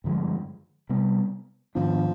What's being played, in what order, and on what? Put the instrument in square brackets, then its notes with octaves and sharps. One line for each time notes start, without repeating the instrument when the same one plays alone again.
[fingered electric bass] G2 D3 F3 G#3
C3 G3 B3
[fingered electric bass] G#2 D#3 B3 D4 [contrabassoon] F3